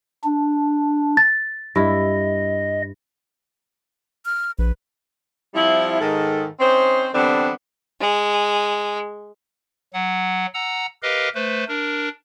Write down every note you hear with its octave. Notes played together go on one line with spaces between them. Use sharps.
D4
A6
G2 E4 D#5
F6
A#1 B4
F3 G3 C4 E4
G#2 D#3 A4
C4 C#4 D#4 C5
D3 E3 G3 B3 C4 D4
G#3
F#3 F#5
F#5 A#5 E6
G4 A#4 B4 D#5 F5
A3 B4 C5
D4 A#4